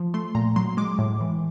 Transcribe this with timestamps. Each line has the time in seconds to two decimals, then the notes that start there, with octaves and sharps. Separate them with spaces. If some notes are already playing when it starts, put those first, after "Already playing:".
Already playing: F3
0.14 A3 C6
0.35 A#2 A#5
0.56 F#3 C6
0.77 G#3 D6
0.98 A2
1.21 E3